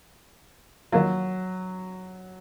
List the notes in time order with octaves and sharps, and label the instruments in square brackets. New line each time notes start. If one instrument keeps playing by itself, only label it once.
[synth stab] D#3 A#3 F4 [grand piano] F#3